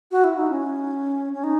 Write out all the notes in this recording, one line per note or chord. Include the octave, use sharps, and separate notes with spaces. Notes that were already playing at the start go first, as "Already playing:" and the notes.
F#4
E4
D#4
C#4
C#4
D#4